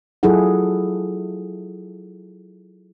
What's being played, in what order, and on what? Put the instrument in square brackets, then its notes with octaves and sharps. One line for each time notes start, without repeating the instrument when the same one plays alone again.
[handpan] F#3 E4 F4 G#4 A4 F#5